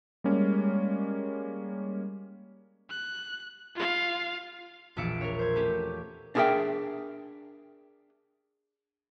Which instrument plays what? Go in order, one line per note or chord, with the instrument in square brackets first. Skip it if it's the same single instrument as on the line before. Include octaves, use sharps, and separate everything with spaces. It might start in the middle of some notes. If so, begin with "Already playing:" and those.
[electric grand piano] G3 G#3 A#3 C#4
[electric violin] F#6
F4 F5
[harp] E1 A#1 F4 E5 C#7 D7
A#4 C#5
C5 G#6
A3 C#4 G4
[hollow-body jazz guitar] D4 E4 G#4 A#4 E5 G5